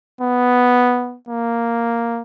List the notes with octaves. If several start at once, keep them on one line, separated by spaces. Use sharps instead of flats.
B3
A#3